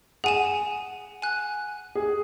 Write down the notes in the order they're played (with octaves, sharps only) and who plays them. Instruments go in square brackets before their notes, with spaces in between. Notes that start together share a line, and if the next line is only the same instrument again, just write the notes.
[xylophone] G#4 G#5 E7 [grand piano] F#5
[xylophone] G#5 F#6
[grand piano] G#4